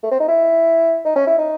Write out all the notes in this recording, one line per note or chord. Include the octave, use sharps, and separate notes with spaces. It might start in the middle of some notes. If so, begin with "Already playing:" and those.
A3
C4
D#4
E4
D#4
C#4
E4
D#4